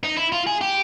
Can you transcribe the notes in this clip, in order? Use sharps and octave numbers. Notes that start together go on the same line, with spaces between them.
D#4
E4
F4
G#4
G4